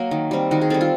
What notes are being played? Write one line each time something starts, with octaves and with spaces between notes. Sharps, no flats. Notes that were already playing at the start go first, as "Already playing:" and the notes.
Already playing: F#3 A#3
D#3
G3 C4
D#3 F#4
G#4
G3 C4 A4
F4